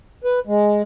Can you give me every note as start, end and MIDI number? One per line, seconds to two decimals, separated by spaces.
0.24 0.40 71
0.47 0.82 56